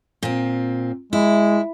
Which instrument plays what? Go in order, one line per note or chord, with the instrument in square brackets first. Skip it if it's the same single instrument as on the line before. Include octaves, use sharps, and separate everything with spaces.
[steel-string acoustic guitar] A#2 C4
[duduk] G#3 [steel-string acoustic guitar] E4